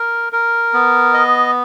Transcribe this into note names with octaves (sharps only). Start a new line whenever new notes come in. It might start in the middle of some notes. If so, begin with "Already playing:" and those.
Already playing: A#4
A#4
B3
D#5